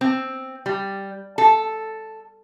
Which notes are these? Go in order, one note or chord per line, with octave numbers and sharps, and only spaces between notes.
C4
G3
A4